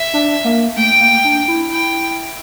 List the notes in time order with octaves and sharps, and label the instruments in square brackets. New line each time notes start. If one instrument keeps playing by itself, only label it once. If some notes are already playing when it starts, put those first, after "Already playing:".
Already playing: [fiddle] E5
[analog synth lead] D4
A#3
[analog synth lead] A3 [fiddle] G5
[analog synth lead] A#3
D4
E4
[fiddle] G5